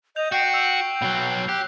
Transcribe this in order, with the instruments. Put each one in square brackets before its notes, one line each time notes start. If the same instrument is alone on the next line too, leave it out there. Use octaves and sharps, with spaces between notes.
[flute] D#5 [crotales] G6 F7
[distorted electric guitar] F#4 [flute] G5 [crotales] G6 C7 F7
[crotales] E6 C7 F7
[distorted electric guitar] B2 F#3
[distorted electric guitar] G4 [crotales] F#6